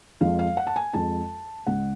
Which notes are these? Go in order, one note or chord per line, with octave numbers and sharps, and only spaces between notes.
F2 F3 G#3 F5
F5
F#5
A5
G#5
F2 F3 G#3 A5
C#2 C#3 G#3 F#5